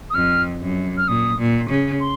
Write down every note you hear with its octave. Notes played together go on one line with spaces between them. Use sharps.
D#6
F2 F6
F#2
F6
A#2 D#6
A#2
C#3
C6